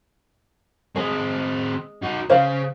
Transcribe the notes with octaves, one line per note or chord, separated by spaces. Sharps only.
G#3 C4 G#4
D#4 F#4
C#3 C5 F5